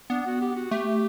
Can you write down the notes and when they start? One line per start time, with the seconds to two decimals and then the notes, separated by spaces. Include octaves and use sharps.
0.10 B3 D4
0.26 F#4
0.41 G4
0.56 F#4
0.71 A3 G4